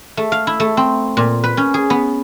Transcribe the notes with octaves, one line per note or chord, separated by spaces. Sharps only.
A3
F5
E4
A3
C4
A#2
B4
C#4
G#4
B3